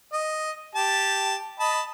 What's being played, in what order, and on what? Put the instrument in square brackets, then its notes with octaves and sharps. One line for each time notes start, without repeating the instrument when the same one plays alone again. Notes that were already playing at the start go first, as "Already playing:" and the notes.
[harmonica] D#5
G4 A5
D#5 A5 B5